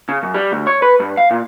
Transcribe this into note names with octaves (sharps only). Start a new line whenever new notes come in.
C#3
F#2
G3
D2
C#5
B4
G2
F5
A#2